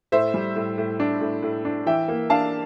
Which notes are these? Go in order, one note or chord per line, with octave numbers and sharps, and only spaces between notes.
A2 C5 E5
G3
A2
A2
D4
A2
A2
D4
E3 E5 G5
A#3
D4 F5 A5